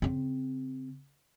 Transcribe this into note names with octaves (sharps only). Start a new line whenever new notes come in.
C#3 C4